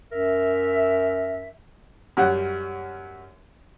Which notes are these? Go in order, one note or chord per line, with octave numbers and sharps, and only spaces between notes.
F#2 A#4 E5
F#2 G3 C#4 F#5